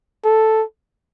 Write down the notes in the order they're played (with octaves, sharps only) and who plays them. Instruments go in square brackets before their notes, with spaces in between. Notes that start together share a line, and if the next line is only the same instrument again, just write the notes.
[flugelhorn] A4